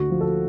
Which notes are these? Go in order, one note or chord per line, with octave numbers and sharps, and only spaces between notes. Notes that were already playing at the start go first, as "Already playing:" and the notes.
Already playing: D2 F#4
F3
A4